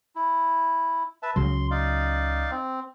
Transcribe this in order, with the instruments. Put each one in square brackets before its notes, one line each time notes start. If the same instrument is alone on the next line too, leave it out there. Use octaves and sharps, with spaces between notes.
[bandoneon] E4
B4 E5 A5
[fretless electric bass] C#2 C#3 F#3 [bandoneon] C6
[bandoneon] D#4 D5 F5
C4